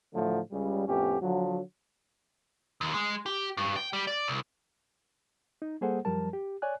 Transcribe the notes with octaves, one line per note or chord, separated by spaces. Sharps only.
A2 D3 F3 F#3 A3
C#2 C#3 G3
F2 A2 B3 C#4 G4
D3 F3 F#3
D#2
G#3
G4
G2
G5
G3
D5
C2
D#4
G3 A#3 G#4 A4 C5 F#5
F#2 F3 G3 A#4 A5
G4
C#5 D5 G#5 F#6